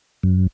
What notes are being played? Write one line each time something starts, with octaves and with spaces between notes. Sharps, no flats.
F#2